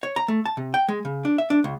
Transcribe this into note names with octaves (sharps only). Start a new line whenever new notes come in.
C#5
A#5
A3
A5
C3
G5
G#3
C#3
D4
E5
D4
C#2